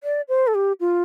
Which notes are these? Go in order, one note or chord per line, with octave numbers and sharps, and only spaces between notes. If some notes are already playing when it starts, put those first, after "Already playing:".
D5
C5
A4
G4
F4